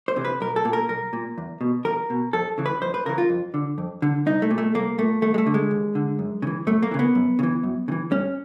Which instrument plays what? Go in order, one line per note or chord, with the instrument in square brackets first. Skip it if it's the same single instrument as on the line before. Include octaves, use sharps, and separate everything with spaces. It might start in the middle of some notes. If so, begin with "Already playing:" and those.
[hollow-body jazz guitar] C5
C3 E3
B4
B1 A#4
A4
A#2
A#4
B1 A#4
A#2
E2
B2
E2 A#4
B2
F2 A4
C#3 E3
B4
F2 C5
B4
C#3 E3 A#4
F4
F2
D3
F2
D3
C2 D#4
A3
A#2
A3
C2 A#3
A#2 A3
D#2 A3
G#3
A3
D3
G#3
D#2
D3
F#2
C#3
E3
F#2 A3
A#3
C#3 E3
B3
F#2
C#3
E3
F#2
C#3
E3
G2 C#4